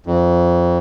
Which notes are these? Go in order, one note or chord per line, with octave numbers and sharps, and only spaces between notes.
F2